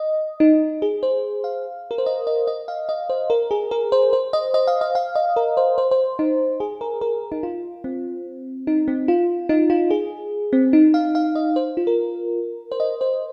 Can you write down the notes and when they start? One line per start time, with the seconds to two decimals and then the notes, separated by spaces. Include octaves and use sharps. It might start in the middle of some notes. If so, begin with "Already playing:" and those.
Already playing: D#5
0.40 D#4
0.82 G#4
1.03 C5
1.44 F5
1.91 A#4
1.98 C5
2.06 D#5
2.27 D#5
2.47 D#5
2.68 F5
2.89 D#5
3.10 C5
3.30 A#4
3.51 G#4
3.71 A#4
3.92 C5
4.13 C5
4.33 D#5
4.54 D#5
4.67 F5
4.81 D#5
4.95 F5
5.15 D#5
5.36 A#4
5.57 C5
5.78 C5
5.91 C5
6.19 D#4
6.60 G#4
6.81 A#4
7.01 A#4
7.32 D#4
7.43 F4
7.84 C4
8.67 D#4
8.88 C4
9.08 F4
9.49 D#4
9.70 F4
9.91 G#4
10.53 C4
10.73 D#4
10.94 F5
11.15 F5
11.35 D#5
11.56 C5
11.77 F4
11.87 A#4
12.72 C5
12.80 D#5
13.01 C5